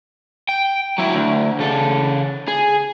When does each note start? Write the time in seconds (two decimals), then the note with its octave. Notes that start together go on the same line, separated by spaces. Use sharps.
0.49 G5
0.98 F#3 E4
1.14 D2
1.59 C#3 A4
2.48 G#4